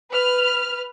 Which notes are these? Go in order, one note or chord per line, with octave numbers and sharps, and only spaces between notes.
B4 F6